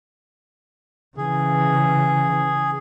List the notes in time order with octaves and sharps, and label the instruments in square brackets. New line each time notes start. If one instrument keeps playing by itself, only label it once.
[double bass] C#3 E3 [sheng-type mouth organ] G#4